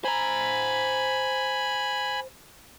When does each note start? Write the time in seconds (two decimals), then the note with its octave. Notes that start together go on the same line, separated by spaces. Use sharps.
0.04 C5 G#5 A#5 B5